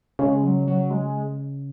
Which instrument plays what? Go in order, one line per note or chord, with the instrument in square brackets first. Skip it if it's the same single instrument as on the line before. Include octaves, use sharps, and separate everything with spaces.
[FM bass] C#3 [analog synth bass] G#3
[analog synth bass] F#3
F#3
G#3